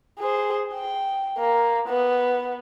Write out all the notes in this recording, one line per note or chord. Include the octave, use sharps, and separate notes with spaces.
G#4 C5
G5
A#3
B3